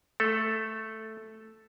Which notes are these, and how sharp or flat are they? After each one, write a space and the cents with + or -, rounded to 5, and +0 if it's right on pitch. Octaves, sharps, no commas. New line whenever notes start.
A3 +0 A4 +0